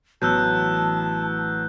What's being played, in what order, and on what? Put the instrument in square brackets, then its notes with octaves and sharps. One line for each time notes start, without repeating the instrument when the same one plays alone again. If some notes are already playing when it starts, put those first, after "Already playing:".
[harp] A1 [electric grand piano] F#3 B3 [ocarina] A5 [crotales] E6 F#6 G6